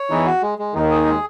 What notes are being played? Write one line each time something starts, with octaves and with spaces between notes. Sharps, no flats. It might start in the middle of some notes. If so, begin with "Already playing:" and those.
Already playing: C#5
E2 E3 D#4
F#4
G#3
G#3
D#2 D#3 D#4
G#4
G#3